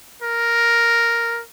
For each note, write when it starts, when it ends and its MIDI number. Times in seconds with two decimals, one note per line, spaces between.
0.22 1.42 70